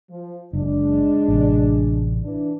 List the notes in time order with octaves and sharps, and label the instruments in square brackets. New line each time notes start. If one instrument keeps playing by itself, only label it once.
[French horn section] F3
[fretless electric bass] F#1 [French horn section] G#3 D4
[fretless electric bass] A1 C3
[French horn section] E3 D4